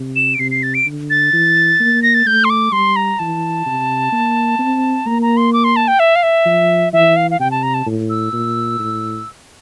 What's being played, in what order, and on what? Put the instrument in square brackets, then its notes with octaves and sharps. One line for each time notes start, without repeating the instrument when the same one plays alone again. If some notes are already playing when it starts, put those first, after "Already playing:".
Already playing: [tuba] C3
[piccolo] E7
D7
[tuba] C3 [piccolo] C7
[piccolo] C7
A6
D7
[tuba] D3
[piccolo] A6
[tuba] E3
A#3
[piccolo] A#6
A6
[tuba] A3 [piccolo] G6
[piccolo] C6
D6
[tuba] G3 [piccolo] C6
[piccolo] A#5
[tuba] E3 [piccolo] A5
[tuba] C3
A#3
C4
[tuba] A#3 [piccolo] A#5
[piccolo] A#5
C6
D6
C6
A5
G5
E5
F5
E5
[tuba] F3
[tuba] E3 [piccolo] E5
[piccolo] F5
F5
[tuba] C3 [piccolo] G5
[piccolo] A5
A#5
A5
[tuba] A2
[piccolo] E6
[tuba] A#2
A2